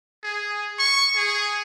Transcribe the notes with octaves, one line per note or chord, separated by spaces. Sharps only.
G#4
C#6
G#4